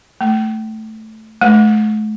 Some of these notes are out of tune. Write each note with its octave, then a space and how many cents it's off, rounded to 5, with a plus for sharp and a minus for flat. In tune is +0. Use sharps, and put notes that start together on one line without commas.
A3 -5
A3 -40